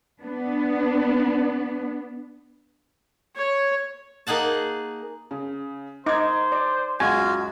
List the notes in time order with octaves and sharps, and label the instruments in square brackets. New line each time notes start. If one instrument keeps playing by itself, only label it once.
[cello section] B3 D4
[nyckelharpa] C#5
[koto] A#3 D#4 G#4 F#5 A5
[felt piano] C#3
[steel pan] D#4 [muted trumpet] C5 [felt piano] D6 G#6
[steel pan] D5
[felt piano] C#2 F#2 G#3 [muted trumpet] F4 [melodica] F#4 [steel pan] G#5